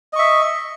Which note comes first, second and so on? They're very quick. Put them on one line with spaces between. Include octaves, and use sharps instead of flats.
D#5 C#6 E5